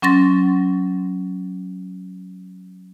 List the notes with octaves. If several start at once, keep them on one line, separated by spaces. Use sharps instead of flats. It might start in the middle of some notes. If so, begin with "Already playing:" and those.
F#3 C#4 C6 A6 A#6